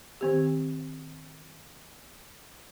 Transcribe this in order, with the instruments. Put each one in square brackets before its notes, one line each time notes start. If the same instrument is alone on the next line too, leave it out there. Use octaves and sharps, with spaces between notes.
[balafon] D#3 C4 G4